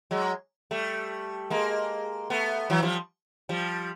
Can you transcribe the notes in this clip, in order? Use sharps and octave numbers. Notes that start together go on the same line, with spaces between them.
F#3 G#3
G3 A3
G#3 A#3
A3 B3
E3 F#3
F3 G3
F3 G3